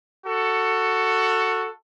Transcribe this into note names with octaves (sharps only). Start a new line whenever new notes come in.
F#4 A4